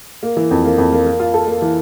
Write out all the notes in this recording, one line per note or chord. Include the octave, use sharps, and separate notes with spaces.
A#3
E3
F2
A#3
F2
A#3
A#3
F4
A4
A#3
E3